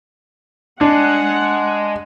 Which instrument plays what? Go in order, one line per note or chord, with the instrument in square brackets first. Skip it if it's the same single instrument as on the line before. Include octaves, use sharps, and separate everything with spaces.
[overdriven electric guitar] G#3 [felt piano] D4 [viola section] F#5